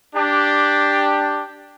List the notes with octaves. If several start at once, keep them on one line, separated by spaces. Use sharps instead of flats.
D4 G4